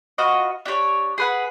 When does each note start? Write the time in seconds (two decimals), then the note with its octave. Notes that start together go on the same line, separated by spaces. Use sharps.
0.18 F4 F#4 B4 D#5
0.66 D4 G4 A4 C#5
1.18 G#4 B4 F#5